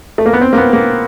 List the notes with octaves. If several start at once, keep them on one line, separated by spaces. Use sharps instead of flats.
A3
A#3
B3
C4
A#3
B3
A#3